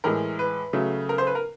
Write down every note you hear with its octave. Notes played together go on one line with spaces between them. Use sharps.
A2 E3 G#3 A#4
B4
C#3 F#3 A3
A#4
C5
B4
A#4